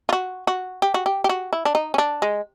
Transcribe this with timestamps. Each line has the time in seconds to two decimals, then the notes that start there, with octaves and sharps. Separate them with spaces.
0.09 F4
0.13 F#4
0.47 F#4
0.82 G4
0.94 F#4
1.06 G4
1.24 G4
1.29 F#4
1.53 E4
1.65 D4
1.75 D#4
1.94 C#4
1.98 D4
2.22 G#3